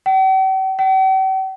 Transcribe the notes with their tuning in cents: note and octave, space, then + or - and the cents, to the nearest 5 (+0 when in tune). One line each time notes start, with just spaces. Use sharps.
G5 -45
G5 -45